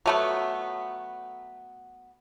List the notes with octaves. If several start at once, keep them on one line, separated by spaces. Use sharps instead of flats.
F#3 A3 B3